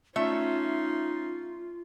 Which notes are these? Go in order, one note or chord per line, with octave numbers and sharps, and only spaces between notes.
A3 C#4 D#4 F4 E5 C6